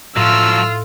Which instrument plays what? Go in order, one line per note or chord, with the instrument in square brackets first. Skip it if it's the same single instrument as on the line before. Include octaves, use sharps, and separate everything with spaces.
[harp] A2 [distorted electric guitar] F3 F#3 [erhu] F4 [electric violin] E6 F6